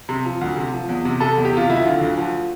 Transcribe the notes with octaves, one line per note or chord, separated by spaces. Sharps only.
C3
F3
D2
C3
F3
E2
C3
C3 A4
E2
G4
C3 F4
D2 E4
D3 F4
D2
F3